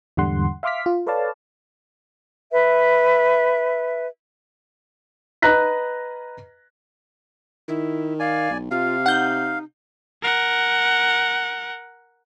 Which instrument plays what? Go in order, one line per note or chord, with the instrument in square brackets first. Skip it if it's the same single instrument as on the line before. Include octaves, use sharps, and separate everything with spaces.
[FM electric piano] E2 G#2 D3 G3 F#5 C6
E5 F5 C6 D6 F6 B6
F4
A4 B4 C#5 D5 F5 A5
[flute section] B4 E5
[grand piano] B4 D#5 A#5 F#6 A#6 B6
[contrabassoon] D#3 [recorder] E4
[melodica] D5 G#5 [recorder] F5
[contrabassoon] B1
[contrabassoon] C3 [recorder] F4 [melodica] F5
[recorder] D#4 [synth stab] F#5 G6
[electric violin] A#4 F#5